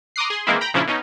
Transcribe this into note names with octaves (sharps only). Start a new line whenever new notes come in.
A#5 C6 D6 D#6 F#6 C7
G#4 C6
D#3 E3 G#3 A#3 C4 E4
G5 A#5 B5
A#2 C#3 F3 C#4 D4 E4
B2 C#4 D#4